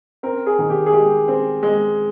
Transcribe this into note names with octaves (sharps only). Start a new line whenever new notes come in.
C4 A#4
G#4
D#3
G4
G#4
G#3 G4
C4
G#3